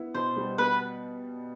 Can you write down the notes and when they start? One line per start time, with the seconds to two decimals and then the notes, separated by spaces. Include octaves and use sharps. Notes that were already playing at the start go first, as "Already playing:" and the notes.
Already playing: B3 E4
0.14 B2 C5
0.37 G3
0.58 B3 B4